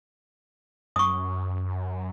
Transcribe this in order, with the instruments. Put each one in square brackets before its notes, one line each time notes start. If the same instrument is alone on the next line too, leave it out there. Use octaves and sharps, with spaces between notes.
[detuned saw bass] F#2 [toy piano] C#6 D#6